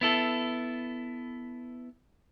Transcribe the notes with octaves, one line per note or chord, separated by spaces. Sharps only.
B3 E4 A4